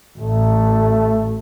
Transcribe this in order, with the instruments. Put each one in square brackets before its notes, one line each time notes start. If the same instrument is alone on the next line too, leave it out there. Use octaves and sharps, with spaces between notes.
[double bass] A1 [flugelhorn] A3